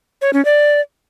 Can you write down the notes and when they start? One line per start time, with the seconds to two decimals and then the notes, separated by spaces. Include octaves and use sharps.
0.22 C#5
0.33 C#4
0.45 D5